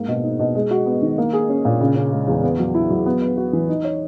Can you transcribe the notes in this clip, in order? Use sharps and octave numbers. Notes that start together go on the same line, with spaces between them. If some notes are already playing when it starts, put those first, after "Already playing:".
Already playing: G#2 A#3
B2
D#4
B2
G#3
F#4
B3
D#3
A#3
G#4
C#4
A#2
C#3
C#4
G#3
E2
B3
F#3
E4
F#3
B3
B4
F#4
E3
D#4
C#5